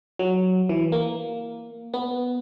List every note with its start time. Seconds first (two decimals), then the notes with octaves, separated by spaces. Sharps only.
0.19 F#3
0.69 E3
0.92 A#3
1.94 B3